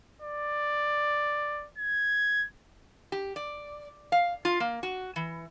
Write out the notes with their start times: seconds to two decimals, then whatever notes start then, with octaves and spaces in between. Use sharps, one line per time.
0.22 D5
1.78 G#6
3.12 G4
3.36 D5
4.12 F5
4.45 F4
4.60 A#3
4.83 F#4
5.16 E3